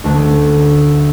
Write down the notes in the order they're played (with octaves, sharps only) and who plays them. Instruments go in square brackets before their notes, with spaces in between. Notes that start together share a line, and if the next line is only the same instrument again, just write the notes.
[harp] D2 A3